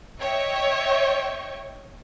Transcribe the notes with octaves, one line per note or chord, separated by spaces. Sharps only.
C#5 D#5 E5 G5 C#6